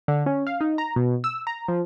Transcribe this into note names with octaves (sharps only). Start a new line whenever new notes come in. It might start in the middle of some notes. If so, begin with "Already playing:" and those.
D3
C#4
F5
D#4
A#5
B2
E6
A#5
F3